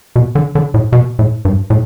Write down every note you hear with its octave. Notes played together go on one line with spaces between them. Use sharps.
B2
D3
D3
A2
B2
A2
G2
A2